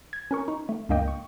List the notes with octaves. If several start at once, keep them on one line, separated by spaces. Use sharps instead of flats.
G#6
C#4 A#4 C#6
D#4
A3
C#2 G2 A#3 D#5 G5
C#6